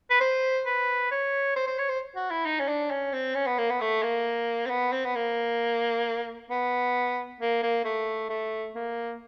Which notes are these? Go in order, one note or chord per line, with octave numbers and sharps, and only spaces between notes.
B4
C5
B4
C#5
C5
C5
C#5
C5
F#4
E4
D#4
C#4
D4
C#4
C4
C#4
B3
A#3
B3
A3
A#3
C4
B3
C4
B3
A#3
B3
A#3
A#3
A3
A3
A#3